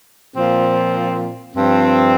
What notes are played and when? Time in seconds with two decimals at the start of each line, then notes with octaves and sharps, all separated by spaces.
0.35 A#2 F3 C4 F4
1.56 G2 F3 C4